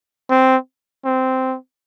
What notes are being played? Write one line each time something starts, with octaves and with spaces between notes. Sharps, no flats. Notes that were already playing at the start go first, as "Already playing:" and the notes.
C4
C4